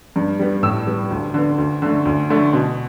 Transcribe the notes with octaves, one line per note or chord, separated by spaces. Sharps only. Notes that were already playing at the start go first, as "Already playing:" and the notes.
G2
G3 B3
A2 E6
G3 B3
D2
D3 B3
D2
D3 A3
D2
D3 A3
B2